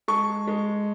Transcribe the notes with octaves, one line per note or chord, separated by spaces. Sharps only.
G#3 A5 C#6
G#3